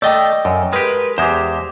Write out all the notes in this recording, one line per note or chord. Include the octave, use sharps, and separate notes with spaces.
A3 D5 D#5 G5
F#2
G#3 G4 A#4 B4
E2 G#3 G4 C5